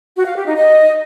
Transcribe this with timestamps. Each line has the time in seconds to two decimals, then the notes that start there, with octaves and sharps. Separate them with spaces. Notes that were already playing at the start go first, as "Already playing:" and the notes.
0.16 F#4
0.26 F5
0.36 G4
0.46 D#4
0.56 D#5